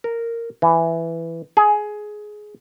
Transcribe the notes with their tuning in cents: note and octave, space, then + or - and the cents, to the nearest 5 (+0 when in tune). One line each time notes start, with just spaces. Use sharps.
A#4 -10
E3 +10
G#4 +15